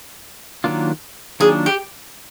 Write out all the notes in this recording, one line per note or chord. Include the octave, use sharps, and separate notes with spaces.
D#3 F#3 A#3 D4 F4
D#3 F#3 A#3 D4 F4 G#4
G4